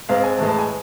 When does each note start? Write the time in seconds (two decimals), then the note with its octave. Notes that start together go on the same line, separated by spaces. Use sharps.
0.09 G#2 G#3 C4 F5
0.24 G#5
0.38 A2 E3 G#3 A5
0.49 A5
0.59 G#5